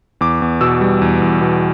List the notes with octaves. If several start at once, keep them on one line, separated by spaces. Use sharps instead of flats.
E2 D6
E2
B2 E6
G3
E2
E2
B2